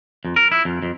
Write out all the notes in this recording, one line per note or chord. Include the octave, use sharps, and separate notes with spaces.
F2
A#4
E4
F2
F2